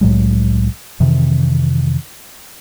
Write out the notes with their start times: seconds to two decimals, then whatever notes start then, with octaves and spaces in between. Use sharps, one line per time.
0.01 C2 A2 F#3 G#3
1.00 F2 C3 D#3 E3